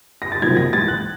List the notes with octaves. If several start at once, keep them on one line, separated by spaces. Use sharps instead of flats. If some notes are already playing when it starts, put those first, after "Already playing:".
A#6
A6
F#1 F2 C3 D#3 F#3 G#6
A#6
G#1 G#2 E3 A6
F#6